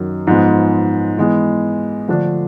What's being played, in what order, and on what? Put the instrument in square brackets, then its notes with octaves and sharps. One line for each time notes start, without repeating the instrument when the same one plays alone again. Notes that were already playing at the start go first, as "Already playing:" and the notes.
Already playing: [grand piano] F#2 D#3 F#3
G#2 F3 G#3 B3
E3 G#3 B3
D3 F3 A3 D4